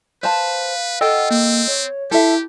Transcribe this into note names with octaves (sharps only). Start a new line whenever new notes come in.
B4 C5 F5 A5
F4 A4 D#5 F#5 G5
A#3 C4
C#5
E4 G4 A4 E5